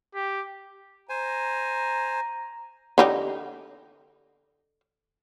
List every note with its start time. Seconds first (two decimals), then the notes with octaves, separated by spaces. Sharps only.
0.14 G4
1.09 C5 G#5 A#5
2.98 D3 D#4 G4